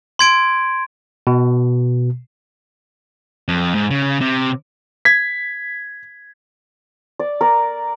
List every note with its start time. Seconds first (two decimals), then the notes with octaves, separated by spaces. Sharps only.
0.19 C6 G#6 D7
1.27 B2
3.48 F2
3.75 G#2
3.91 C#3
4.21 C3
5.05 G#6 B6
7.19 D5
7.41 A#4 D5